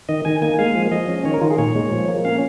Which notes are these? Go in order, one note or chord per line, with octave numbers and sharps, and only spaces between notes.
D#3 D#5
D#3 G#5
A#3 G#5
G#3 F5
F3
F3 D#5
C#4
D#3 C#5
A#4
D#3 F4
G#4
A#2 C#5
G#3
F3
A#3
C#4 F5